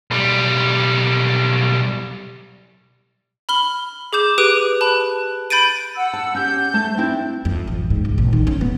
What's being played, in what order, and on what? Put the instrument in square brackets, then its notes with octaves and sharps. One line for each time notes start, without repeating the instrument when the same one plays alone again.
[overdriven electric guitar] B1 G3
[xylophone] B5 F6 G7
G#4 D6 G6 E7
G4 B4 D#6 F#6 D7 D#7
A5 B5 F#6
B5 G6 A6 D7 D#7
[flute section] F#5 E6
[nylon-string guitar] A5
[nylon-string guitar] C#4 G4 [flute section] G6
[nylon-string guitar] A3 A5
C4 D4 E4
[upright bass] F2
A1
G#2
C#2
A#1
D#3
C#4
B3